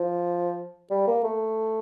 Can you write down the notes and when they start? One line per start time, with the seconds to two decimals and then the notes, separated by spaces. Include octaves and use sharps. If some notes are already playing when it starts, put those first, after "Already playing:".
Already playing: F3
0.91 G3
1.08 A#3
1.24 A3